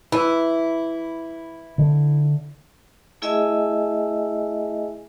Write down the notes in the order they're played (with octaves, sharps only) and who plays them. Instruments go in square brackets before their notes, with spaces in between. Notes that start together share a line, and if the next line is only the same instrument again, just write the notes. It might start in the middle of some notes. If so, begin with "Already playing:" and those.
[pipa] E3 [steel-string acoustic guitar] E4
[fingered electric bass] D3
[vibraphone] A3 E4 G#4 D#5 E5 G#5